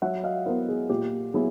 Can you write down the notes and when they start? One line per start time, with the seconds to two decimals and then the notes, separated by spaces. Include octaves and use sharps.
0.02 F#3 E5 F#5
0.24 D#5 F5
0.46 B3 E4 A#4 C5
0.69 G#4
0.90 A#2 G4
1.34 F#3 B3 E4 G#4